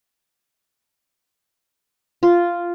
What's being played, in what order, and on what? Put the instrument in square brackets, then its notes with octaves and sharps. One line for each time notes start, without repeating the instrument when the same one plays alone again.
[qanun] F4